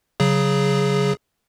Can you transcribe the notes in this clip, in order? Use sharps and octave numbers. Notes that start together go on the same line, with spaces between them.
C#3 F#3 G#4